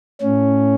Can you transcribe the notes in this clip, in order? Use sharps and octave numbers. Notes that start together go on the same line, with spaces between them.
A2 C#4